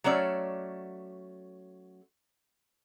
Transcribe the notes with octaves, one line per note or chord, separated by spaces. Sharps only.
F#3 A3 C#4 D5